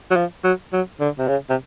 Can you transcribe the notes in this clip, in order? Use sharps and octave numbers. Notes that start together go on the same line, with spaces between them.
F#3
F3
F#3
F#3
D3
C3
C#3
C3